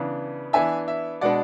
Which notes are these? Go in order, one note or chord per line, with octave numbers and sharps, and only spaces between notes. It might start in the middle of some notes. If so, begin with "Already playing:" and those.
Already playing: C#3 E3 B3 D4
E3 B3 D4 E5 G#5
E5
B2 G#3 B3 D4 D5 F#5